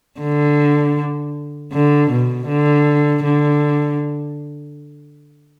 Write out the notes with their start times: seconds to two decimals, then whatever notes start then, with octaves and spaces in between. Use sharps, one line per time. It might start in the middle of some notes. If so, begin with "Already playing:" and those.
0.20 D3
1.73 D3
2.11 B2
2.48 D3
3.24 D3